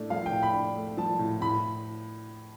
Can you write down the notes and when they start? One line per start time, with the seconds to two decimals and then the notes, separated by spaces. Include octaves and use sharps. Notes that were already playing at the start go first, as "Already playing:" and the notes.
Already playing: A2 A3 D4
0.10 F3 F5
0.26 G5
0.31 A2
0.43 B5
0.53 D4
0.76 A3
0.97 F3 A5
1.19 A2
1.41 A2 B5